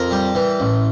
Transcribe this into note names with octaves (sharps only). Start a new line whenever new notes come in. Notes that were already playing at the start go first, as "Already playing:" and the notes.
Already playing: F2 A#4
G3
E3
A1